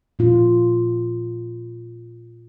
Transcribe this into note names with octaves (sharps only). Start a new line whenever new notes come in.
A#2 F4